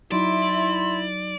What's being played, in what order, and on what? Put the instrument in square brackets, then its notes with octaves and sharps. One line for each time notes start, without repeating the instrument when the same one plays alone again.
[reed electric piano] F#3 D#4 [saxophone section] E4 [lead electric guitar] D5 [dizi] C6